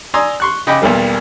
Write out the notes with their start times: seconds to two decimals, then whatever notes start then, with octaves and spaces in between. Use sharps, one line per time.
0.14 D5 G#5 A#5 C6 D#6 E6
0.40 C6 C#6 F#6
0.67 C#3 D#5 G5 B5 D6
0.82 B1 E2 G3 A#3